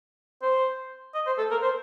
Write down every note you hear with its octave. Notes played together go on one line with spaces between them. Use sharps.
C5
D#5
C5
A4
A#4
C5